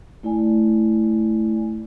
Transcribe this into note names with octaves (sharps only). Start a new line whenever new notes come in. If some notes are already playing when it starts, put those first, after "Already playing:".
A3 E4 D5 G#5